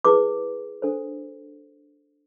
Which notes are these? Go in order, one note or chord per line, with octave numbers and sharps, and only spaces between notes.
E4 G#4 B4 D6
D4 A4 C5